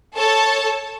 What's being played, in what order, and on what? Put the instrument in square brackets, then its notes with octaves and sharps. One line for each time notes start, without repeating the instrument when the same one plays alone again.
[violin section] A4 C#5 A5